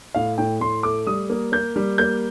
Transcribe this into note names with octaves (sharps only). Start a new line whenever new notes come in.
A2 F5
A2 G5
A2 C6
A3 D6
G3 D#6
A#3
A#3 G6
G3
A#3 G6